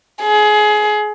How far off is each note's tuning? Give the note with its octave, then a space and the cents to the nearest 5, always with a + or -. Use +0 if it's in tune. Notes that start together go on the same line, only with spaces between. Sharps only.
G#4 +25